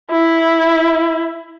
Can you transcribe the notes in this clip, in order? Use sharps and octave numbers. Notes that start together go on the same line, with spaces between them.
E4